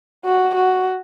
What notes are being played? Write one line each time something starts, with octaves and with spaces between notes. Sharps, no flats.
F#4
F#4